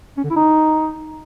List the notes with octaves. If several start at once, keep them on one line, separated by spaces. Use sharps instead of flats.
C#4
D3
E4
D#4